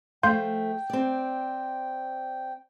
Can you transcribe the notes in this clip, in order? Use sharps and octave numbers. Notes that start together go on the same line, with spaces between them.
F3 A3 F5 G5 C6 G6
C4 D5